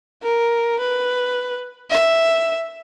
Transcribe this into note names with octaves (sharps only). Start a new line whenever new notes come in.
A#4
B4
E5